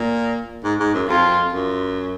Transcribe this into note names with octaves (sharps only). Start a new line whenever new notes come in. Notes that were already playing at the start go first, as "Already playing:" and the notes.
Already playing: A#2
G#2
G#2
F#2
F2 F4
F#2